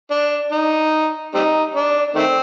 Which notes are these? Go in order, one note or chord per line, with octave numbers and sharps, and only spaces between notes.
D4
D#4
G3 C4 D#4
D4
D#3 A3 C4